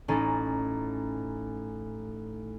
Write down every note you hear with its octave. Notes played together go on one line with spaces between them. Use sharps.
A1 C#4 D#4 A6